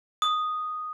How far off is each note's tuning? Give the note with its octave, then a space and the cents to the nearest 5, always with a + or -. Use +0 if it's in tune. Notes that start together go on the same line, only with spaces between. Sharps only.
D#6 -5